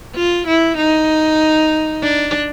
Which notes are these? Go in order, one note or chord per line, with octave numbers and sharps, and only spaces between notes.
F4
E4
D#4
D4